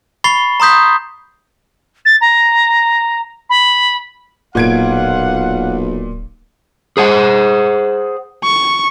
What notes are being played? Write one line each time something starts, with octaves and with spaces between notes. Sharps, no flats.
B5 C#6 A6 C7 G7
A#5 C6 D#6 G6 B6
A6
A#5
B5
D1 B1 A#2 F5 F#5 G#6 D7
G#4 C5 F#5
C#6